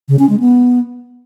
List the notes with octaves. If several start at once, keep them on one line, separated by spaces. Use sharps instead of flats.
C#3
C#4
G#3
B3